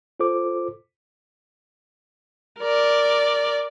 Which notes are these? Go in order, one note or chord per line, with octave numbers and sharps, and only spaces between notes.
F4 A4 C5 D6
A#4 D5